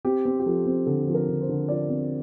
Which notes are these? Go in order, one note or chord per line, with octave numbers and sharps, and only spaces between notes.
C4 G4
C4
G4
F3 A4
C4
D3 A4
F3
A#4
D3
C5
D3
F3 D5
C4